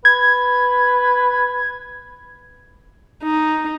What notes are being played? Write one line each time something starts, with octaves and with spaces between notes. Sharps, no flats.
B4 G#6
D#4